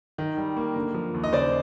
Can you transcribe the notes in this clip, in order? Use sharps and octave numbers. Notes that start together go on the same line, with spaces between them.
D#3
G3
A#3
D3
F3
D#2
D#5
C#3 C5 D5